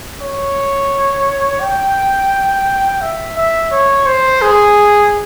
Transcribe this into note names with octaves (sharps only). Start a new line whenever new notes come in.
C#5
G5
E5
E5
C#5
C5
G#4